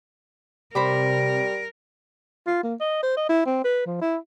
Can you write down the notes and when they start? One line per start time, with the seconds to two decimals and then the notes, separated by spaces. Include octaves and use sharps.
0.75 C3 G3 A#4 C5 B5 D6
2.47 F4
2.63 A#3
2.80 D#5
3.03 C5
3.17 D#5
3.29 E4
3.46 C4
3.65 B4
3.86 F3
4.02 E4